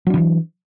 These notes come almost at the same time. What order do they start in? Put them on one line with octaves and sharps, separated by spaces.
F#3 D4 D3 E3